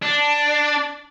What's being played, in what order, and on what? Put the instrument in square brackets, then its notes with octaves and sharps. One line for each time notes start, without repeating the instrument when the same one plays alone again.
[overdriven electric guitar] D4